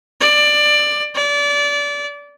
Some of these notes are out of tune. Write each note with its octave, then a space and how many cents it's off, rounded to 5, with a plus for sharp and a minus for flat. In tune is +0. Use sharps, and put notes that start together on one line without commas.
D5 +15
D5 -25